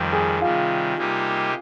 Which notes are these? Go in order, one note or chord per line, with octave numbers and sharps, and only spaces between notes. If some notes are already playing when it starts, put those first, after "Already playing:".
Already playing: F2 D#3 G3
G#4
C3 D#3 G3 F4
C3 G3 A#3 D#4 G4